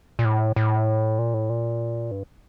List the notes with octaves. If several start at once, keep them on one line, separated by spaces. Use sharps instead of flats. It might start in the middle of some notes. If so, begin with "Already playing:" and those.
A#2
A2
A2
A#2
A2
A#2
G2